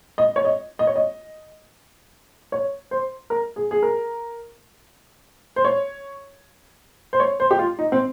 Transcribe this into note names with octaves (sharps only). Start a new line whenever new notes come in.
D#5
C#5
D#5
D#5
C#5
D#5
C#5
C5
A#4
G#4
G#4
A#4
C5
C#5
C5
C#5
C5
G4
F4
D#4
C4